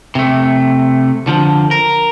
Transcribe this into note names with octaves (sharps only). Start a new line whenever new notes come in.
C3 A3
D3 F3
A#4